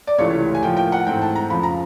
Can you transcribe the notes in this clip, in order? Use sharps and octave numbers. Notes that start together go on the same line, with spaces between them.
D5
C#2 C3 E3 A3 C#5
G#5
A2 F3 A#3 G5
G5
F#5
G#2 E3 A3 C4 G5
A5
A#5
F2 C#3 F3 B5
A#5